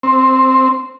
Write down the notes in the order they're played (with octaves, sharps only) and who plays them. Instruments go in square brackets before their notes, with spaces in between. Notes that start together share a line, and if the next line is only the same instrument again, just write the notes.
[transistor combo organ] C4